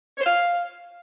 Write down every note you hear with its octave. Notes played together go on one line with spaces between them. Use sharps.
C#5
C5
F5